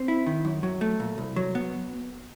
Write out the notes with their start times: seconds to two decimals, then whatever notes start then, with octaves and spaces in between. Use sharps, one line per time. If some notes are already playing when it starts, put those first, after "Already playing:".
Already playing: C4
0.08 E4
0.26 D#3
0.45 F#2
0.63 F#3
0.81 A3
1.00 A#2
1.18 C2
1.36 F#3
1.55 B3